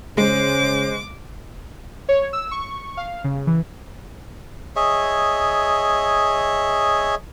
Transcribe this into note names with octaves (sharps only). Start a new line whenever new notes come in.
C#3 G#3 C5 D6
C#5
E6
C#6
F5
C#3
E3
G#4 C#5 D#5 E5